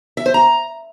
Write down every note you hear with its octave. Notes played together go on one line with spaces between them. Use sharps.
E5
C5
A#5